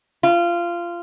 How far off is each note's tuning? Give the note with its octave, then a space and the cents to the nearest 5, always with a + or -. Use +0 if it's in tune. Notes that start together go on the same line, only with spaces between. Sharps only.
F4 -20